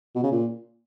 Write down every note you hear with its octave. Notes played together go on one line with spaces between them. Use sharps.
B2
C#3
A#2